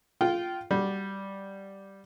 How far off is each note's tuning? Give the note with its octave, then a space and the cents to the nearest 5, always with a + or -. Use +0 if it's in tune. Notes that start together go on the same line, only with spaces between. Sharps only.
F4 +0 G5 -20
G3 +0 F#4 +0